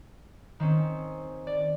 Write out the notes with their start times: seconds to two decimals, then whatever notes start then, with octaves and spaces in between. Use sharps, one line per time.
0.60 D#3 C4 C#4
1.47 D5